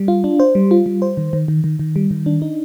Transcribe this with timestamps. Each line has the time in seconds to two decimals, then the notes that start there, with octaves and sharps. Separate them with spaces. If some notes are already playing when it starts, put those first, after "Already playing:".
Already playing: G3
0.08 F4
0.24 D4
0.40 C5
0.55 G3
0.71 F4
0.86 G3
1.02 C5
1.17 D#3
1.33 D#3
1.48 D#3
1.64 D#3
1.79 D#3
1.96 G3
2.11 D#3
2.26 D4
2.42 D#4